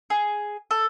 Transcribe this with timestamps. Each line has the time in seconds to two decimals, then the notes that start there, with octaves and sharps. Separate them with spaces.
0.10 G#4
0.71 A4